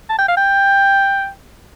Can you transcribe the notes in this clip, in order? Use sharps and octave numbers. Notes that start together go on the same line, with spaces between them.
A5
G5
F5
G5